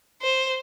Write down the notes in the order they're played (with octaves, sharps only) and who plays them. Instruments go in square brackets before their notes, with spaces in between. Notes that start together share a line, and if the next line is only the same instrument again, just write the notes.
[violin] C5